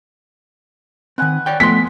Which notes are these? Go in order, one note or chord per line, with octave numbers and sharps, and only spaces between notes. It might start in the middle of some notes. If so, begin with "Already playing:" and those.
D#3 C4 B4 F#5 G#5
C#5 D5 G5
F3 G#3 A3 B3 F#5 C6 B6